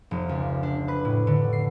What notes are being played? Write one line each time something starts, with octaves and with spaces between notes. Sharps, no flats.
F1
C#2
D4
B4
A2
D3
C7